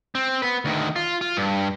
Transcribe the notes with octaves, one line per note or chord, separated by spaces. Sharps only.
C4
B3 B4
D2 D#3
F4
F4
G2